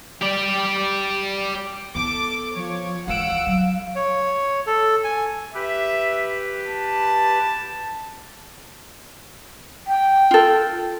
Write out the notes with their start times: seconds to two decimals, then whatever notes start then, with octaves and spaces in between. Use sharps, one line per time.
0.22 G4 D5
1.95 B3 E4 A4 D6
2.55 F3 C#5
3.07 C#2 E3 F5 F#5 E6 D7
3.46 F#3
3.96 C#5
4.67 A4
5.04 G#5
5.54 G4 B4 E5
6.67 A5
9.87 G5
10.31 F4 A4